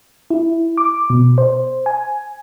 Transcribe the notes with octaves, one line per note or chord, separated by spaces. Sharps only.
E4
D6
B2
C5
G#5